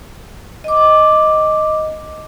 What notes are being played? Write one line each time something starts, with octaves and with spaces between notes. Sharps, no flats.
D#5 D6